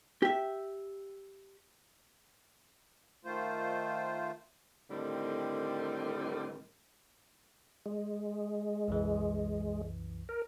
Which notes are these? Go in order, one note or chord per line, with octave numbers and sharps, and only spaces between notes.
G4 E5
D#3 A3 F4 C5
A2 D3 D#3 G3 C4
G#3
C2 F#2 E3
A#4